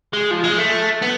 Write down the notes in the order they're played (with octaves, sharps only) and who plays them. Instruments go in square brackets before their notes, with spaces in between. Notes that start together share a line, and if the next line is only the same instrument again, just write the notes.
[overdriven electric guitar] G#3
F3
G#3
A3
B3